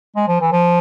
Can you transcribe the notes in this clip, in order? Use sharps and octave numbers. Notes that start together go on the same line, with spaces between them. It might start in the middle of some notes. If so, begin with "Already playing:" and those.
G#3
F3
E3
F3